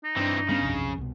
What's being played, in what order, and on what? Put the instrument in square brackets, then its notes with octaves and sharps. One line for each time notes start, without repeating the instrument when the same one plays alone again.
[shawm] D#4
[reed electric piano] G2 D4 [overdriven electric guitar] E3 C4
[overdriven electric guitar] C#3 [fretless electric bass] G3 B3 C#4
[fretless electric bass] B1 F2 C3
C2 B2